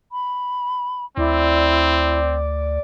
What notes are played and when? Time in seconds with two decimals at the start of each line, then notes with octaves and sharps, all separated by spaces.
0.12 B5
1.17 D2 C4 E4 D5